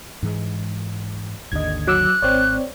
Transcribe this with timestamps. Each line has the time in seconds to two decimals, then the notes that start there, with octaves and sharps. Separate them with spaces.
0.23 G#2 E3 G#3
1.52 G#1 D#2 D3 D#5 G#6
1.87 F#3 D6 E6 F#6
2.22 G#1 C4 C#5 D5